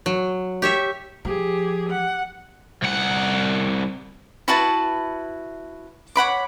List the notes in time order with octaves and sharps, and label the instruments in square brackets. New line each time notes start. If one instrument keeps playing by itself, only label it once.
[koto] F#3
G4 C#5 E5
[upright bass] F3 [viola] G4 G#4
[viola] F#5
[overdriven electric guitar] C2 F#5
[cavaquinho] E4 F#4 B4 A5
C#5 F#5 B5 D6